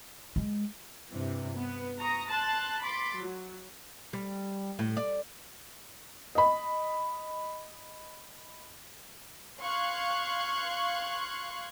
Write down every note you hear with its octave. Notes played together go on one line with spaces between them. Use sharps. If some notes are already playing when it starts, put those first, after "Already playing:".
G#3
G2 C3 E3
B3
A#5 C#6 D#6 A#6
A5 C6 F#6 A6
B5 C6 D6 A6 B6
F#3
G3
A2
D5
D#5 B5
F5 C6 C#6 F#6 G#6